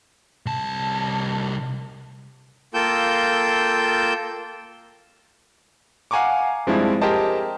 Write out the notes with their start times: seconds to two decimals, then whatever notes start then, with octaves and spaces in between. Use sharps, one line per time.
0.46 C2 A5
2.74 A#3 F4 A4 G5 E6 G6
6.11 F5 F#5 G#5 A#5 C#6 D6
6.67 G2 F3 G#3 C4 D4 E4
7.02 G4 G#4 A#4 C5 D#5 A5